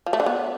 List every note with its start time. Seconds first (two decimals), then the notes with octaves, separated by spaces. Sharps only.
0.06 F3
0.13 A3
0.20 D3
0.26 B3